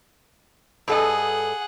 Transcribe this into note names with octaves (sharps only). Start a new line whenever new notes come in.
G2 G#4 A4 D#5 F#5